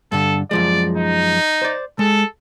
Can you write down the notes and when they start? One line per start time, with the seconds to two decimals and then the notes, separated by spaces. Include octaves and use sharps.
0.12 G2 D3 A4
0.51 F#2 F3 G#3 D5
0.97 D#4
1.62 C5 D5
1.99 G#3 A4